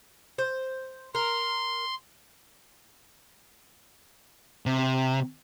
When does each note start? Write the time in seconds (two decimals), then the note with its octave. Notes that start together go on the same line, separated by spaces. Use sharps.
0.38 C5
1.15 A#4 C6
4.66 C3